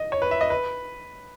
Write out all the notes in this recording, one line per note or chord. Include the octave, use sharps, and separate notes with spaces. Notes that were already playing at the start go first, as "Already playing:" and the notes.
Already playing: D#5
C#5
B4
E5
D#5
B4